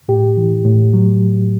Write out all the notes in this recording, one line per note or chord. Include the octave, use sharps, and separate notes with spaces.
A2 G4
E3
A2
F#3